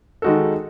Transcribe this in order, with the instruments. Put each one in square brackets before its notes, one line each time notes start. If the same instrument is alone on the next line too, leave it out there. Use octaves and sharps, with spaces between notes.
[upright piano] D#3 G#3 D#4 F#4 A4